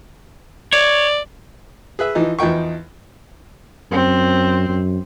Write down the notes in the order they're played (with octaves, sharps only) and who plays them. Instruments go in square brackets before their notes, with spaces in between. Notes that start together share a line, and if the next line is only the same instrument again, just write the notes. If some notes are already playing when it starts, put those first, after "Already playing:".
[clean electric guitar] C#5 [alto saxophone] D5
[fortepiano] G#4 B4 E5
E3 F3 D#4
E2 F3 D#4 G5 C#6
[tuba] F#2 [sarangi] C4
[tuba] F#2